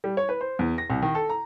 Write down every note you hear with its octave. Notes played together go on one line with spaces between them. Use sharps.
G3
C#5
B4
C5
E2
A#6
C2
D#3
A4
A#5